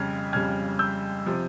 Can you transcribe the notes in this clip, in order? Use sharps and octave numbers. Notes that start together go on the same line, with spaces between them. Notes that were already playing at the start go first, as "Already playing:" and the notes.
Already playing: F2 C#3 G3 F6 G#6
F2 C#3 G3 F6 G#6
E6 G6
C3 F3